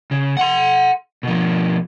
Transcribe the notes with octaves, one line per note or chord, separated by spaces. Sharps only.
C#3
F#5 C6
B2 F3